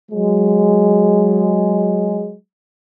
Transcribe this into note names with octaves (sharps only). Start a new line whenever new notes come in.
F#3 G#3